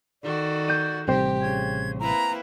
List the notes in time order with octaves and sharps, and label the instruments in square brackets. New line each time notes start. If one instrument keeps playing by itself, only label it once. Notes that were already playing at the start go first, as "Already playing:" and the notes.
[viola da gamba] D#3 F#4 A4 [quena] D5
[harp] G6 D#7
[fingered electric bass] A1 C3 G3 [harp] C4 C5 [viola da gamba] G4
[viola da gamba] C#3 [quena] G#6
[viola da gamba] A#3 E4 B4 [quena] A#5